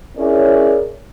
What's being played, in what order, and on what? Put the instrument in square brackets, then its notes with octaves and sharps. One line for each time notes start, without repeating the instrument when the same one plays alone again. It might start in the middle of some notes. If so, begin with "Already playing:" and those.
[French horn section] C#4 E4 G#4 A#4 C#5 D5